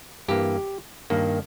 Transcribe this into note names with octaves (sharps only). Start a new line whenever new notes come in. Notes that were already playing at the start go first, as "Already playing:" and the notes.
G2 E3 A#3 G4
G2 D#3 A#3